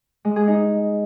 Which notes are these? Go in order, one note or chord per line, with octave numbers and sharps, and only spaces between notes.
G#3
G#4
D#4